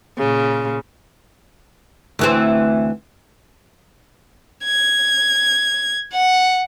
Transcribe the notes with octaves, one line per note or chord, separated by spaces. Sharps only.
A#2 C#3
D2 E3 C4
G#6
F#5